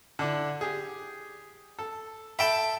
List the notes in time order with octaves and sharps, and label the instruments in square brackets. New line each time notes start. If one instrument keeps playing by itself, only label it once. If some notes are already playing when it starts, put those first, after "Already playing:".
[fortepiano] D3 D4 E4
G4 G#4
A4
[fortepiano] A4 B5 [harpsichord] E5 G5 A5